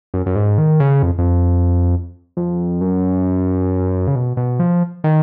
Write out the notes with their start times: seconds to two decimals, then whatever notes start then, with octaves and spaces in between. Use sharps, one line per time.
0.14 F#2
0.26 F#2
0.36 G#2
0.58 D#3
0.80 C#3
1.03 F2
1.19 F2
2.37 F2
2.81 F#2
4.08 C#3
4.15 B2
4.37 B2
4.59 F3
5.04 D#3